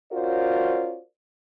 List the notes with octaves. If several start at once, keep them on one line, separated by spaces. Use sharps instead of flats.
C#4 F4 F#4 A#4 C5 D5